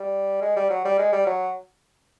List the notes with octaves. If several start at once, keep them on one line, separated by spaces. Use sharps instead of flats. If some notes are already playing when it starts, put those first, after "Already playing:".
Already playing: G3
G#3
G3
F#3
G3
G#3
G3
F#3